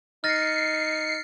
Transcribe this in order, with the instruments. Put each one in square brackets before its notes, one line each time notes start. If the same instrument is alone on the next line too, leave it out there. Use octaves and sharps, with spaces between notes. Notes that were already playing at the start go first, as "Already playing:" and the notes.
[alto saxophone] D#4 [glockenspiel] F6 A6 A#6 [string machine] C7 C#7